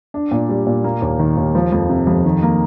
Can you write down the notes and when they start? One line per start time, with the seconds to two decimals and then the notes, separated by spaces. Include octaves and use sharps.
0.14 D4
0.31 A#2
0.49 G3
0.67 A#2
0.84 A#3
1.02 D#2
1.19 D#3
1.37 D#2
1.55 F3
1.72 F2
1.90 C3
2.07 F2
2.25 D#3
2.43 A#3